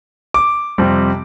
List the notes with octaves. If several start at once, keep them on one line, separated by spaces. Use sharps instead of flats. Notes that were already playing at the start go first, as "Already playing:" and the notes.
D6
F2 C3 G3 C4